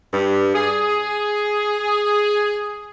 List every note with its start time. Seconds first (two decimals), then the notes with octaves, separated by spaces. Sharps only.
0.12 G2
0.54 G#4